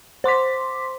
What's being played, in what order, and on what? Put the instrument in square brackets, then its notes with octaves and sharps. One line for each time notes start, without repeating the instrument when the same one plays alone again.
[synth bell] C5 C6 D6 B6